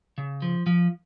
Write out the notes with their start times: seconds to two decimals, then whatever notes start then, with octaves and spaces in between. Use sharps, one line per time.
0.18 C#3
0.42 F3
0.66 F3